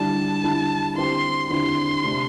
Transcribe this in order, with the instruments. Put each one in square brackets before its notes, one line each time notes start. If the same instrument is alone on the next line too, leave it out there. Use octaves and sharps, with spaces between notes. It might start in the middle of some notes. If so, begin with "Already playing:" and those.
Already playing: [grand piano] D3 G3 E4 G4 [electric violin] A5
[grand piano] D3 G3 E4 G4
[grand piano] D3 C4 E4 G4 [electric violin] C6
[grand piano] D3 C4 E4 G4 [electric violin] C6
[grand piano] C3 A3 D4 G4